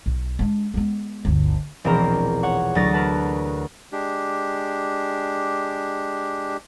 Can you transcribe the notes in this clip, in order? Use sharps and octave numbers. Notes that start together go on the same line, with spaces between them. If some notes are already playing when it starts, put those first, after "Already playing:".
B1
G#3 D4
G#3 B3
G1 D2
E1 A#1 E3 C4 A#4 A#5
C#5 F#5 C#6
D2 F#3 D#6 A6 A#6
A#4 B4 A5
G#3 D4 G4